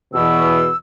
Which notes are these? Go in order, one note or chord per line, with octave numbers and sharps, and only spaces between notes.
E2 B2 E6